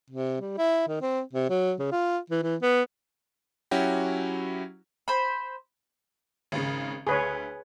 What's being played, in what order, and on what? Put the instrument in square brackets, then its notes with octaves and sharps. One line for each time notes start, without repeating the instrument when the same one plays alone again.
[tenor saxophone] C3
G3
E4
D#3
C4
C3
F#3
C#3
F4
E3
E3
B3
[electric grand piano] F#3 C#4 E4 F#4 G4
[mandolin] C5 B5
[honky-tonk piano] G#1 C#3
[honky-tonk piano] D2 [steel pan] G#4 B4 C#5